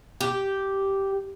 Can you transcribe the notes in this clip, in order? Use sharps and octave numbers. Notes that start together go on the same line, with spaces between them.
G4